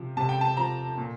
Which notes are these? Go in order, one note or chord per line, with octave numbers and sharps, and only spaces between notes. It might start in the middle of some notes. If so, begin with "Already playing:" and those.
Already playing: C3 F3
C3 A5
G5
A5
F3 A#5
A#2